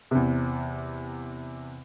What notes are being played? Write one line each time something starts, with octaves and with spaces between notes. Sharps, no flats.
E2 C3